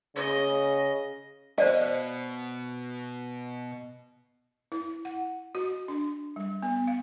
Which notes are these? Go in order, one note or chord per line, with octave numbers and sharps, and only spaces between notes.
C#3 D#5
B2 C5 D5 D#5 F5
E4
F#5
F#4
D4
G3
B3
F5